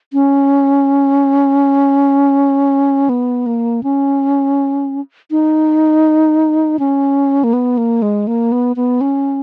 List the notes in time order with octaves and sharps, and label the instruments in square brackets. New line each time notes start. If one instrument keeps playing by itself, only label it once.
[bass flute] C#4
B3
A#3
C#4
D#4
C#4
A#3
B3
A#3
G#3
A#3
B3
B3
C#4